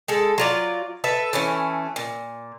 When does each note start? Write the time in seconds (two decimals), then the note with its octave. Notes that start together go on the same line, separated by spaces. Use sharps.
0.08 G#3 A4
0.38 F#3 F4 D5
1.04 A4 B4 E5
1.33 E3 A3 C#4
1.96 A#2